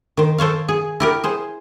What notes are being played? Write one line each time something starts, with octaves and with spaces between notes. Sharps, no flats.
D#3 C5
A4 C5 C#5 F5
G#4
E4 G4 A#4
G#4 C5